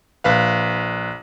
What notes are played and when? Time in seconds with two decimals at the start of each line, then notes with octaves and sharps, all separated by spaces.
0.24 A#1 B4 F5